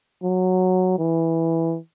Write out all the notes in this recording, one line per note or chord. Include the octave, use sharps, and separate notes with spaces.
F#3
E3